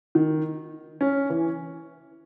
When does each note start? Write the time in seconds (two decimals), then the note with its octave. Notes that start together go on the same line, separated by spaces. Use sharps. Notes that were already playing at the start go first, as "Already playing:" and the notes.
0.15 D#3
1.01 C#4
1.30 E3